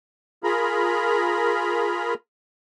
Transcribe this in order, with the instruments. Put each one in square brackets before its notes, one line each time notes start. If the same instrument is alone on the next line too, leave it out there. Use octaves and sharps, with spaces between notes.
[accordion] F4 G#4 A#4 A#5 B5